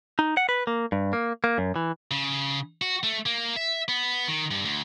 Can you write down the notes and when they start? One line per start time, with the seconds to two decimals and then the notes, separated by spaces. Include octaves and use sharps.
0.19 D#4
0.37 F#5
0.49 B4
0.67 A#3
0.92 G2
1.13 A#3
1.44 A#3
1.58 F#2
1.76 E3
2.11 C#3
2.82 F#4
3.03 A3
3.26 A#3
3.56 E5
3.88 B3
4.28 D#3
4.51 G2
4.65 D2